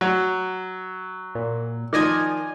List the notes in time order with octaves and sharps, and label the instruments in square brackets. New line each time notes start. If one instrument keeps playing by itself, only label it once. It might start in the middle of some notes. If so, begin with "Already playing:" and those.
[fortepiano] F#3
[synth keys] A#2
[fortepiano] D#3 F3 [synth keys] D5 D#5 G#5